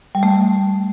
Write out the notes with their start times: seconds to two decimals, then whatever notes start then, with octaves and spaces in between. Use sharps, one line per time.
0.15 G3
0.23 A3